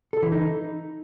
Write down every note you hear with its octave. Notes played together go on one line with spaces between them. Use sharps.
A4
E3
D#4